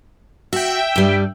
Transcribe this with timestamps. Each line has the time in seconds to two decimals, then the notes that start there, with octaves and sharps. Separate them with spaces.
0.53 F#4 E5 G5
0.96 G2 G3